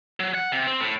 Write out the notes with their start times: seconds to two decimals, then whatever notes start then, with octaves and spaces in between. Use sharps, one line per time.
0.20 F#3
0.35 F#5
0.52 C3
0.67 C4
0.81 A2